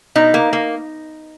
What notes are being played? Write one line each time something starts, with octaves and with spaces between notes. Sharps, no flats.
B2 D#4
A#3
A#3